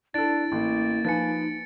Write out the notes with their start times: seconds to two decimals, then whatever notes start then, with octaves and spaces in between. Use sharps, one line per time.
0.14 D4 E4 A4 A6 D7
0.52 A1 A#3
1.05 F3 D#4 B4 G#5 A6 C#7